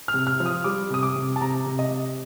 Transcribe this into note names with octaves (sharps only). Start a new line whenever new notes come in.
F6
C3
F6
F3
D#6
G3 D6
C3 D#6
D6
C3
A5
C3 A#5
C3
D#5
C3